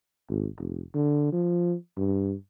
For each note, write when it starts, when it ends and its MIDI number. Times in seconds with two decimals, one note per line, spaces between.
0.28 0.48 32
0.58 0.83 29
0.95 1.28 50
1.32 1.75 53
1.97 2.35 43